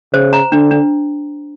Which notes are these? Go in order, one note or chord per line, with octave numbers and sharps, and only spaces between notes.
C#3 C5
A#5
D3 D4
D4